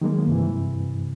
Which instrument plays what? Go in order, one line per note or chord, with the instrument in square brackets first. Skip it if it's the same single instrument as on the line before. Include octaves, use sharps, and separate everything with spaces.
[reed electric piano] D#3 F#3 G#3 A#3
G2 C3 E3